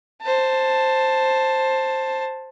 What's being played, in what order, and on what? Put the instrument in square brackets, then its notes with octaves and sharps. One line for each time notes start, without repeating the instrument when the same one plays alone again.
[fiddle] C5 A5